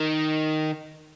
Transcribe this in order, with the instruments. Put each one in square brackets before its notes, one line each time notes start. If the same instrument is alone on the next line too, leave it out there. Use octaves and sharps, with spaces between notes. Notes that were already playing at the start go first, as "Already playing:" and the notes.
Already playing: [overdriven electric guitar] D#3